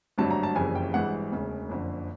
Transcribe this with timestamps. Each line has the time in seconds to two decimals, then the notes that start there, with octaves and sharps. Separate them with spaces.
0.18 G#1 G2 D3 F#3 A3 A5
0.31 A#5
0.43 A5
0.55 F#1 F2 C#3 E3 G3 G#5
0.75 G5
0.94 G#1 G2 E3 G#3 F#5
1.32 E1 D2 C#3
1.69 F#1 F2 D3